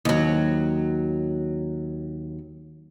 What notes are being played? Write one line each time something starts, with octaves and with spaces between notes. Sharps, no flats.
D#2 F#3